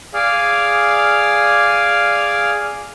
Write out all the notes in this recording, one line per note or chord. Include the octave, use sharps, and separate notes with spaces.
G#4 D5 F5